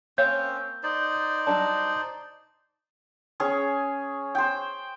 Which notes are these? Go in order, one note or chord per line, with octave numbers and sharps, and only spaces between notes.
A#3 C4 C#4 C#5 F5 G6
D#4 C5 D5
F#3 G3 D4 A5
C#4 G#4 C#5
C5 G5